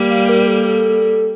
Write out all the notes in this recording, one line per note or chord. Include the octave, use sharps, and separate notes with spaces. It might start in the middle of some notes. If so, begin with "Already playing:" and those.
Already playing: G3 A#3
F5
A#4
A4
A4